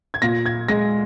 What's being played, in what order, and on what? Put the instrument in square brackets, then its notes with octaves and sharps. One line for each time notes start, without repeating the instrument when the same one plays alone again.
[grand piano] G#6
A#2 A#6
G#6
G#3 A#6